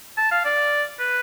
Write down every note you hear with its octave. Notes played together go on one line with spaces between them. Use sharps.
A5
F5
D5
B4